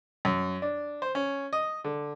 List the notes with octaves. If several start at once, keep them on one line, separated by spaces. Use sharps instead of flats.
F#2
D4
C5
C#4
D#5
D3